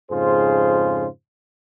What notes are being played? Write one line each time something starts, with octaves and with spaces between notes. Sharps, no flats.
F2 G#2 C#3 F4 G#4 C5